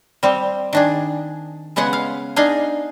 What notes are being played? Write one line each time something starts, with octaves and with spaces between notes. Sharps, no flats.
G3 C4
D#3 D4 G#4
C#3 G#3 B3 F#5 G#5
F5
D4 D#4 G#4 D#5 F5 G#5